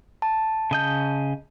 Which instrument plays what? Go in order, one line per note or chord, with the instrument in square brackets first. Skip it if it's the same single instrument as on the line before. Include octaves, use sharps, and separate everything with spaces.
[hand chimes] A5
[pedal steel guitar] C#3 D#5 G6